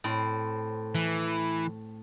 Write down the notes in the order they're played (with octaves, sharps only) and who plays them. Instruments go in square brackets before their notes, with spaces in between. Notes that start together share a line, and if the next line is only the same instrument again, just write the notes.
[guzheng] A2 C4
[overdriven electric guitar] E3